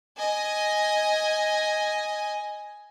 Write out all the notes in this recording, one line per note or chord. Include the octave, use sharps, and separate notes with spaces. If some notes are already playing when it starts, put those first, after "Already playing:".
D#5 G#5